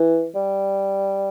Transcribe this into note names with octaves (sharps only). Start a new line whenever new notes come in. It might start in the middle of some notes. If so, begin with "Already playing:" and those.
Already playing: E3
G3